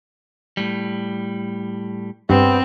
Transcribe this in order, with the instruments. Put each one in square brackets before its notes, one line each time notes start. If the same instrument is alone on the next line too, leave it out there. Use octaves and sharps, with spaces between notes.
[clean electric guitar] A2 G3
[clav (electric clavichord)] G2 [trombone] B3 [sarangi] C4